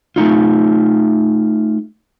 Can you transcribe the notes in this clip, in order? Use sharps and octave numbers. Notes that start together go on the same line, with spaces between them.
A3 C#4 D#4 F4